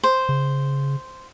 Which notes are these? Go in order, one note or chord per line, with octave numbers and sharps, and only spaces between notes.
C5
C#3